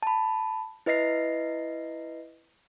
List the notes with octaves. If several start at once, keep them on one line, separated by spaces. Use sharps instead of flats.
A5 B5
E4 B4 D#5 A#6 C7